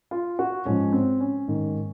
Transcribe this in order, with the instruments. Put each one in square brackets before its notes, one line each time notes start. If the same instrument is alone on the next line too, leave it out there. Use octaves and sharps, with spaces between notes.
[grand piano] F4
F#4
G#2 F3 G#3 C#4
C4
C#4
G#2 D#3 A#3